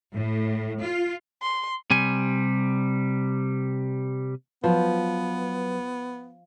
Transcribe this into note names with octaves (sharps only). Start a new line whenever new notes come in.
A2
F4
C6
C3 G3 G#5
F3 F#3 B3 B4